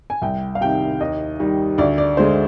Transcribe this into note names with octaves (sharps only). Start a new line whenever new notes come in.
G#5
C2 G5
F5
C3 D#3 G5
D#2 D#5
D#3 G3
D2 D5
D5
D3 G#3 C5